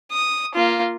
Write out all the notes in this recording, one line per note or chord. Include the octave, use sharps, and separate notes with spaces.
D#6
A#3 F4